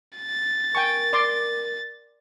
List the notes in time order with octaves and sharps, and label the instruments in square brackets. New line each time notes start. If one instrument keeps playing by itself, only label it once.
[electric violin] A6
[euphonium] A#4 [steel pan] G5 G#5 C#6
[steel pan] D5 C6 D6